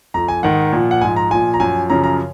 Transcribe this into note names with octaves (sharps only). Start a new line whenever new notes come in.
F2 F3 A#5
G#5
G#2 D#3 F#5
A#2 F3
F#5
G#2 F3 G#5
A#5
A#2 F3 G#5
A#5
F#2 F3 G#5
F#2 C#3 F3 A#5
A#5